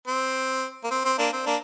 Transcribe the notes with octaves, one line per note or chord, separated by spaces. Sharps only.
C4
A#3
C4
C4
A#3 D4
C4
A#3 D4